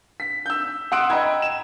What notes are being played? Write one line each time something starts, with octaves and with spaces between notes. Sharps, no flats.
B6
E6 G6
F#5 C6 D#6 E6 F#6 D7
D#5 G5 A#5 B5 E6 G#6
E7